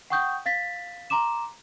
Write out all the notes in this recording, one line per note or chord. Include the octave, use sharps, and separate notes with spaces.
F#5 G5 C#6 D#6 G6
F5 A6 B6
A#5 C6 D6 E7